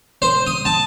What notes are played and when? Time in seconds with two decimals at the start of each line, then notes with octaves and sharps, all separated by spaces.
0.22 C5
0.47 D#6
0.65 A5